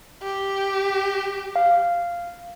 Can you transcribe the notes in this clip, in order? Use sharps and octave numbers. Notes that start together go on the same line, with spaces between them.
G4
F5